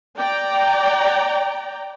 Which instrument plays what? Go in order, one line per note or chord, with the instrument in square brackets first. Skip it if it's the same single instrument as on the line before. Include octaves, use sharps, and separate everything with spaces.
[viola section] D5 G5 A#5